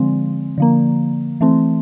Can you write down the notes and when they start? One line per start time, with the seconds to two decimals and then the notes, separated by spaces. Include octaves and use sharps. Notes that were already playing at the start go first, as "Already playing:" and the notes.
Already playing: D3 F3 G#3 C4
0.58 D3 F3 A#3
1.41 E3 A3 C4